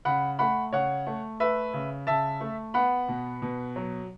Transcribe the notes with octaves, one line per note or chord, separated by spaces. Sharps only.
C#3 F#5 B5
A3 F#5 B5
C#3 C#5 F#5
A3
A3 B4 E5
C#3
C#3 E5 A5
A3
B3 F#5 B5
B2
B2
F#3